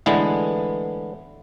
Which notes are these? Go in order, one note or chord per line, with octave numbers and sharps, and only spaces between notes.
A2 D3 E3 G#3 B3